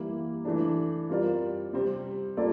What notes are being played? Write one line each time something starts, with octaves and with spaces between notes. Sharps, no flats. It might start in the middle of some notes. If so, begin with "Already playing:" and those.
Already playing: E3 G3 A#3 E4
E3 A3 D4
G3 C4 F4 A#4 D5
C3 G3 C4
G3 A#3 F4 A4 D5